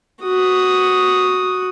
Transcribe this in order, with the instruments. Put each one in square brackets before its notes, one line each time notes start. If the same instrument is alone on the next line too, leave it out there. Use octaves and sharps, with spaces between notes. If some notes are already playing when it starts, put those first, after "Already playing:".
[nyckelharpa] F#4 D#6